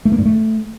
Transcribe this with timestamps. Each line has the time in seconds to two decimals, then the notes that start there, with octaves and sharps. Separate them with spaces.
0.05 A3
0.12 A#3
0.19 G2
0.25 A3